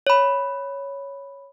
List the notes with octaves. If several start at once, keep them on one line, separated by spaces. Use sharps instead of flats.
C#5 B5